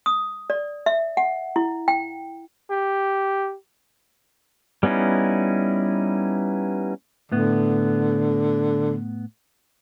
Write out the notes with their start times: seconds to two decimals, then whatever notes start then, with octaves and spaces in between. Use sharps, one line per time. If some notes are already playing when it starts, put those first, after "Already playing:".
0.06 D#6
0.50 D5
0.86 E5
1.17 F#5
1.56 E4
1.88 G5
2.70 G4
4.83 G3 B3 C#4 D#4 E4
7.32 A2 D3 B3